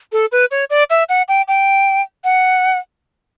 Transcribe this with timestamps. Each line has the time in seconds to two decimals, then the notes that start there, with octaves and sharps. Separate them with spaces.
0.12 A4
0.32 B4
0.51 C#5
0.70 D5
0.90 E5
1.09 F#5
1.28 G5
1.48 G5
2.24 F#5